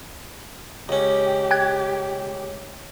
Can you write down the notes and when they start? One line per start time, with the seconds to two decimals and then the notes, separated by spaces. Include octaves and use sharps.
0.89 C#2 C#4 G4
1.51 G5 F#6 G#6